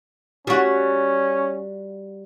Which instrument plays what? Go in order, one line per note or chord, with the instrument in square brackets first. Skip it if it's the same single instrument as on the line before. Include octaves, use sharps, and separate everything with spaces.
[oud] G3 F#4 [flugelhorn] C#4